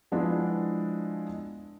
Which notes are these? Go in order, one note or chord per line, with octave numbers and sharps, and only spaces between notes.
F3 G#3 B3 D4 E4